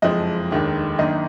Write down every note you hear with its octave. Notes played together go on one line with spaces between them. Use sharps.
F#1 F2 F3 G#3 D#5
F1 D#2 D#3 G#3 D4
G#1 F#2 D#3 A#3 D4 D#5